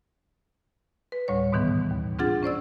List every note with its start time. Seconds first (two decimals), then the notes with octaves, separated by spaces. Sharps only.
1.12 B4
1.28 D2 A2 G3 C#5
1.52 G#2 B2 D#3 E3 B3
1.91 D#2
2.19 C4 D4 F4 G#4 F#5 A6
2.43 C#4 C5 D5 E6